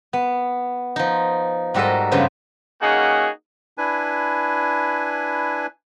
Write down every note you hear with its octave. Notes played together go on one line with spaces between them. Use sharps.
B3
F3 D#4
G#2 G3 F#4 A4 A#4 D#5
G2 C#3 F3 B3 C5
A#3 C#4 D#4 F#4 G#4 F#5
D4 E4 B4 G#5